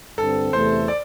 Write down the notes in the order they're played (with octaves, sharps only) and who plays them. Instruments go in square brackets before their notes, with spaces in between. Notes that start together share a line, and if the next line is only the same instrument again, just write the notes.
[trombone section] G2 D3 C4 [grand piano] A4
[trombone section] E2 C3 A3 [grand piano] C5
[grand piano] D5